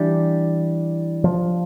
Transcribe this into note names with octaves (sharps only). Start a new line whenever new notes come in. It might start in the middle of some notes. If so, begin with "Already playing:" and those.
Already playing: E3 G3 D4 G4
F3